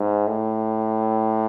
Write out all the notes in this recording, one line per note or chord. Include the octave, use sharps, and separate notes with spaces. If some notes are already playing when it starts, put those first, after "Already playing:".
Already playing: G#2
A2